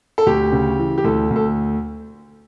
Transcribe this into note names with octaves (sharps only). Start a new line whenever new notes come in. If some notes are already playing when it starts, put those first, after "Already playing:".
A4
D2 G4
C#3
E3
G4
D2 A4
D2
A4